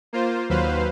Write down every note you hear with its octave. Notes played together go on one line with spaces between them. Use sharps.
A#3 F4 C5
D#2 F#3 B4 C5 F5